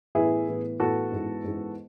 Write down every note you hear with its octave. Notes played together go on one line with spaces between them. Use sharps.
A2 E3 B3 E4 G#4
A2 E3 B3
A2 E3 B3 F#4 A4
G#2 E3 G#3 B3
G#2 E3 G#3 B3